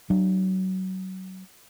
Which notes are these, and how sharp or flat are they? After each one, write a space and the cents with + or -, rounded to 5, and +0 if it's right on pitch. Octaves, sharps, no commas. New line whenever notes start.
F#3 +25 D4 +40